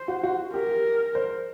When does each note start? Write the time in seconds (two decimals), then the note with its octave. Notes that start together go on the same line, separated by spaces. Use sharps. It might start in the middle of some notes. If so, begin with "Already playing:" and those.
Already playing: C5
0.08 F#4
0.23 F#4
0.53 G4 A#4
1.15 C5